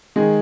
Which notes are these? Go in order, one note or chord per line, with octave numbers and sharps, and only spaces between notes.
D#3 G#3 G#4